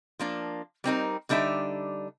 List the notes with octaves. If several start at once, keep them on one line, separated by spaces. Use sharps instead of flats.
F3 A#3 D4
G3 C4 D#4 A#4
D3 G3 D4 D#4 E5